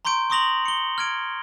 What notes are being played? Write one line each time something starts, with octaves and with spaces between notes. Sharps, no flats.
A#5 C6 C#6 G6 D7
C6 C#6 D#6 A#6 F7 F#7
C#7 G7
F6 G#6 D7